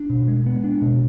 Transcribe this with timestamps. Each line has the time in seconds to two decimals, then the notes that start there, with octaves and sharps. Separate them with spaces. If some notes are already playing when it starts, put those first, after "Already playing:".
Already playing: D4
0.10 B2
0.28 G#3
0.46 B3
0.64 D4
0.82 B2